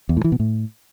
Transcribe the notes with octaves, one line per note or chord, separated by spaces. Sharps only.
E2
A2
E3
B2
A2